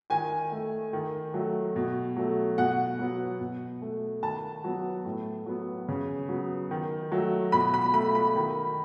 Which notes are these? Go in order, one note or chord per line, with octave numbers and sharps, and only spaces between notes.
D#3 G#5
A3
D#3
F#3 A3
B2
F#3 A3
B2 F#5
F#3 B3
B2
A3
D#3 A5
F#3 B3
A2
F#3 B3
C#3
F#3 B3
D#3
F#3 A3
B2 B5
B5
A3 B5
B5
D#3